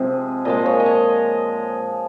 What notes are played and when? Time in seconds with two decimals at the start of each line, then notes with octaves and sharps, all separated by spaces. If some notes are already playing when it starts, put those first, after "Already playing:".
Already playing: C3 F3 G#3
0.45 A#2 F3 G#3 D#5
0.66 C#5
0.80 D#5
0.86 C#5